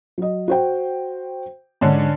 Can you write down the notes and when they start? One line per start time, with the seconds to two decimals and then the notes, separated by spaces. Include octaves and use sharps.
0.18 F#3 D#5
0.48 F#4 C5 G5
1.81 G#2 D3 C#4 D4